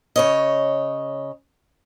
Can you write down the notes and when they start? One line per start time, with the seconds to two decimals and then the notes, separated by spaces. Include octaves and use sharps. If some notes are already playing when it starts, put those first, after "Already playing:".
0.16 C#3 C#5 D#5